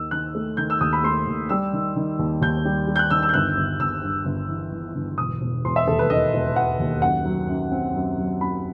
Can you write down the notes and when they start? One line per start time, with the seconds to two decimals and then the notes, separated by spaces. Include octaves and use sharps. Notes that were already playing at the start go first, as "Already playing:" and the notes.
Already playing: D#2 D#3 E6
0.11 D#3 F#6
0.35 A3
0.57 D#3 G6
0.70 E6
0.81 D#2 D#6
0.93 B5
1.04 A3 C6
1.27 D#2
1.49 G3 E6
1.73 D#3
1.96 D#3
2.19 D#2
2.41 D#2 G6
2.65 G3
2.87 G3
2.96 G6
2.99 F#6
3.10 D#3 E6
3.23 E6
3.29 G6
3.34 G1 F#6
3.57 G1
3.80 G1 E6
4.03 G2
4.26 G1
4.49 E3
4.72 E3
4.95 G1
5.18 E1 D#6
5.42 E1
5.65 E1 C6
5.76 E5
5.87 D#2 A4
5.99 B4
6.10 D#3 D#5
6.34 E1
6.56 E1 F#5
6.80 D#2
7.02 F#2 F#5
7.26 F#3
7.49 F#2
7.72 C4
7.95 F#2
8.18 F#3
8.41 F#2 B5